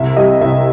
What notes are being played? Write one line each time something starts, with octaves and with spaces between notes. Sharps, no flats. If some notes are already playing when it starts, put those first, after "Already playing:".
Already playing: C2 E5
G3 D#5
C2 E5